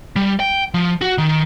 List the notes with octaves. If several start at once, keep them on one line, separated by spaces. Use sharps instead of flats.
G3
G5
F3
F#4
D#3